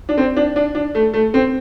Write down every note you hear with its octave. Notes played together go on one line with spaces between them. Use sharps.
D4
C4
D4
D4
D4
A3
A3
C4